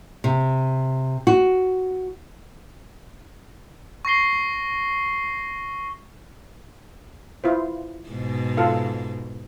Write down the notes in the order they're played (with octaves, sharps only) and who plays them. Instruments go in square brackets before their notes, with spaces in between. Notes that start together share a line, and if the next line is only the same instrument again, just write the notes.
[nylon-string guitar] C3
F#4
[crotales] C#6 A#6 C7 G7
[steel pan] E4 F4 C5
[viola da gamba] G#2 B2
[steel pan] F4 A4 F5